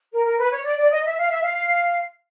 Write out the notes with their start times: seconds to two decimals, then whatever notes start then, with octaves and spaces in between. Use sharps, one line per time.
0.13 A#4
0.25 A#4
0.38 B4
0.51 C#5
0.64 D5
0.78 D5
0.91 D#5
1.05 E5
1.18 F5
1.30 E5
1.42 F5